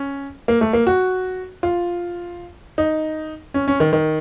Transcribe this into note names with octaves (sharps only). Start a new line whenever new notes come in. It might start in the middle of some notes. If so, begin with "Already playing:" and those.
Already playing: C#4
A#3
A3
A#3
F#4
F4
D#4
C#4
C#4
D#3
D#3